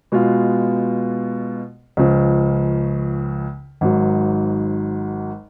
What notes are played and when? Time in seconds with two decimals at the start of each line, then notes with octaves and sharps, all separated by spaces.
0.12 B2 G#3 B3 F4
1.97 C#2 C#3 F3
3.81 G#1 G#2 F#3